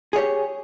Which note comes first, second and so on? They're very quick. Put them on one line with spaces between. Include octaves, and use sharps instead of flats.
G#4 C#5 G4